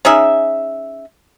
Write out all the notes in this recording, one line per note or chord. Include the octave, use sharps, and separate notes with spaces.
C#4 D#4 G#4 E5